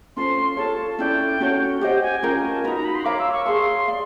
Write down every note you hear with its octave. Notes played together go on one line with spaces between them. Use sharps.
C#4 F4 A4 C5 C6
F4 A4 C#5 A5
C#4 E4 A4 D5 G5
C#4 F#4 A4 C#5
G4 C5 D#5 F#5 G5
G#5
C#4 F4 A#4 G5
G#5
A5
D#4 F#4 B4 A#5
A#5
B5
C6
A#4 C#5 F5 A#5 D6
E6
C#6
G#4 C#5 F5 A5 C6
D5 F5